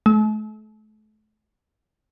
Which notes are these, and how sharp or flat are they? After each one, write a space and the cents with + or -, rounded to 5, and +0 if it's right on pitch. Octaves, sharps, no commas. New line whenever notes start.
A3 -40